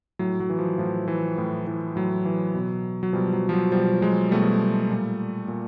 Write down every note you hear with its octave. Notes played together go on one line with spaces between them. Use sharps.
A2 F#3
F#3
E3
F3
A2 F3
E3
A2
E3
A2 F#3
E3
B2
F#3
B2 F3 G3
F#3
F3
F#3
B2 F3 G3
F#3 G#3
B2 G3 A3
A#2
A#2